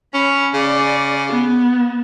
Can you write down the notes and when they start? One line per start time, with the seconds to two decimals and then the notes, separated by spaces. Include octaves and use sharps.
0.14 C#4 B5
0.54 C#3 D5
1.28 B3